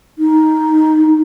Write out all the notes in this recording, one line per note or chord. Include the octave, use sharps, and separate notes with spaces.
D#4